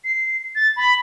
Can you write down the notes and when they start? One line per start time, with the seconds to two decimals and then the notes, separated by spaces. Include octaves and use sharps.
0.04 C7
0.55 A6
0.76 B5